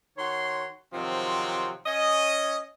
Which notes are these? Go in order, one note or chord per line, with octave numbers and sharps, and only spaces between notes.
D#3 F#4 C#5 C6
C3 D#3 F3 F#3 C4
C#4 D#5